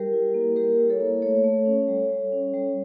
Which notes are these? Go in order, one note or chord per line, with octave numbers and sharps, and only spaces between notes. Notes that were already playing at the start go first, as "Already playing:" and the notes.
Already playing: G3 G4 A#4
E4
A#3
G3 G4 A#4
E4
A4 C#5
A#3
A3 A4 C#5
A3
C#4
G3
G3
C#4
G3